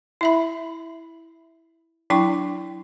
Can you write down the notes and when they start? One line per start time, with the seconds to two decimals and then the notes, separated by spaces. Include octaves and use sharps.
0.21 E4 E5 B5
2.10 F#3 D4 E4 G5 C#6